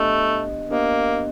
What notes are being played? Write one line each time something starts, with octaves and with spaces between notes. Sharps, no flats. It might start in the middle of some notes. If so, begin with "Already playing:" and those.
Already playing: A3 B3 D4 G4 C5 D#5
A#3 B3 D4 G4 C5 D#5